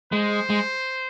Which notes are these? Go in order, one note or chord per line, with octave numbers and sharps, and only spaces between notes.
G#3 C5
G#3